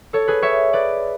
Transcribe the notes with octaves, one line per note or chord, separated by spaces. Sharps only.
A4 C#5
G#4 B4
C#5 E5
B4 D5